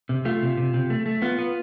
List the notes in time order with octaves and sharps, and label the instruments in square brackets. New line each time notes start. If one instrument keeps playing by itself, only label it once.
[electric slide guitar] C3
A3 F4
C3
C3
C3
A3
A3
B3 F4
B3